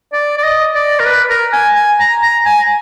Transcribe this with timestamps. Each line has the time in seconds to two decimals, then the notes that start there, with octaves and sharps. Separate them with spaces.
0.12 D5
0.38 D5
0.43 D#5
0.75 D5
1.00 A#4
1.06 B4
1.29 A#4
1.53 G#5
1.75 G#5
2.00 A#5
2.22 A#5
2.45 G#5